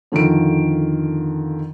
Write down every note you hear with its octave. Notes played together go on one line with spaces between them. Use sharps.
F2 D3 D#3 F4 D7